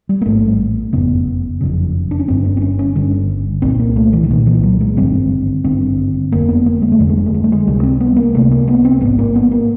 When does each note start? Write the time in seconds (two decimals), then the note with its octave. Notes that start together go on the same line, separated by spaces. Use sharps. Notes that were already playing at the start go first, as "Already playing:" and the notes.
0.09 G3
0.21 A#3
0.26 A1 G#2 A3
0.93 F#1 F2 C#3 B3
1.61 F#1 F2 C#3
2.11 D4
2.20 C#4
2.28 G1 G2 D3 C4
2.44 C#4
2.57 C4
2.62 C#4
2.79 C#4
2.95 G1 G2 D3
3.62 C2 A#2 C4
3.80 A#3
3.96 A3
4.13 E3
4.23 D3
4.30 C2 A#2 D#3
4.46 E3
4.63 F#3
4.81 G#3
4.97 G#1 G2 D3 C4
5.64 G#1 G2 D3 C4
6.32 F#1 F2 D3 A#3
6.49 B3
6.66 A#3
6.82 G#3
6.92 A3
6.99 F#1 F2 D3 G#3
7.09 A3
7.17 G#3
7.26 A3
7.34 G#3
7.44 A3
7.52 G#3
7.67 C#2 C3 G3
7.83 C4
8.00 B3
8.16 A#3
8.34 C#2 C3 A3
8.51 A#3
8.68 B3
8.85 C4
9.01 A1 G#2 B3
9.19 A#3
9.35 B3
9.51 A#3